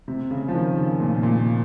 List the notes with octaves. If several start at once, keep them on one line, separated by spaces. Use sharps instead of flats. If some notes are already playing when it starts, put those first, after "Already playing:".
C3
C#3
F3
D#3
C#3
A#2
A#2